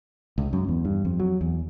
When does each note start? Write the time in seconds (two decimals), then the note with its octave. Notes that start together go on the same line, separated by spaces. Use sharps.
0.38 C#2
0.53 F#2
0.68 E2
0.85 G2
1.05 F2
1.19 F#3
1.41 E2